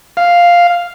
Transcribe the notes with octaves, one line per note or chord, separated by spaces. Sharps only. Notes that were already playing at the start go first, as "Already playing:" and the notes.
F5